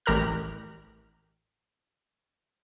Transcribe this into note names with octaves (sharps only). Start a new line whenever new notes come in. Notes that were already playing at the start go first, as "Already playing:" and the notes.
A1 G4 A#4 F6 F#6